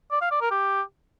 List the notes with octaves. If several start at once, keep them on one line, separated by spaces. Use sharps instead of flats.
D5
F5
D5
A#4
G4